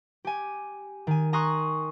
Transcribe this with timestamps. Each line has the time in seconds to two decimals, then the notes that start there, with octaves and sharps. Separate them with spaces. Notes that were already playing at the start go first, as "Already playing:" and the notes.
0.25 G4 G#5
1.07 D#3 G#5
1.33 G#5 A#5 C6 C#6 D#6 F#6